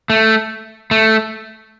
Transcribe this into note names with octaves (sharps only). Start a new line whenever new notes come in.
A3
A3